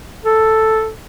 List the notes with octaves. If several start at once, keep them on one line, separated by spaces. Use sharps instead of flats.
A4